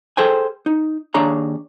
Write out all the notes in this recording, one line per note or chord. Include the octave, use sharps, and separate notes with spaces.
G#4 A4 C5 G5 G#5
D#4
D#2 D4 G#4 C#5 A#5